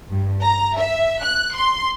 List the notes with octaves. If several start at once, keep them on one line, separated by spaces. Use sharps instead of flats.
G2
A#5
E5
F#6
C6